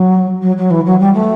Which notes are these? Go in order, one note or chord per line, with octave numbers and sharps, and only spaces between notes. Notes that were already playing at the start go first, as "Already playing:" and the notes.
Already playing: F#3
F#3
F#3
E3
F#3
G3
A3